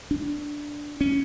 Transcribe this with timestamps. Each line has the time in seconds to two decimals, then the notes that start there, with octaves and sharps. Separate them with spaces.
0.11 D4
1.01 C#4